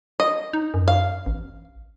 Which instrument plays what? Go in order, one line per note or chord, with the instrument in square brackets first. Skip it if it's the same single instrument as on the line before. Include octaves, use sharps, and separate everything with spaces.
[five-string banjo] D#5
[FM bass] D#4
F#2
[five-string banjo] F5
[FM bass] A1